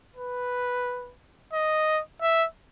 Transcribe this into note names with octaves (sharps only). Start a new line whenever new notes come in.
B4
D#5
E5